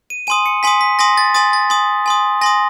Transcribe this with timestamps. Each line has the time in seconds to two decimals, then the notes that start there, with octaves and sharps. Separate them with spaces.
0.10 D#7
0.27 G#5 C6 D#6 D#7
0.46 C#7
0.63 G#5 C6 D#6 B6
0.81 B6
0.99 G#5 C6 D#6 A#6
1.17 A6
1.34 G#5 C6 D#6 A6
1.53 A6
1.70 G#5 C6 D#6
2.06 G#5 C6 D#6
2.41 G#5 C6 D#6 A#6